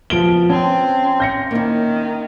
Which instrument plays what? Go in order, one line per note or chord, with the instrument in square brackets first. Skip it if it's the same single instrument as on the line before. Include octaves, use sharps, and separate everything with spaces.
[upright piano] F3 D7 G7 [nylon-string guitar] B3
[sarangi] C4 [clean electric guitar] C#4 [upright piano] A5
[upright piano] G6 A#6 C#7
[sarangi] D#3 [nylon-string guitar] A#3 E4